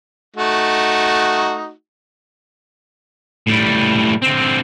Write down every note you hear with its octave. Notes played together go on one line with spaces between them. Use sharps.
A3 D#4 F#4
A2 G3
D3 C4